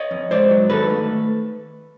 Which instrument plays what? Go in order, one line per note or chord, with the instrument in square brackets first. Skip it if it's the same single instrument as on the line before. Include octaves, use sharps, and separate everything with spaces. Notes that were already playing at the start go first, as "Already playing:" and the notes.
Already playing: [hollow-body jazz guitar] C#5 D#5
F2
G#2 C5 D5
F#3
D#3 A4 B4
A3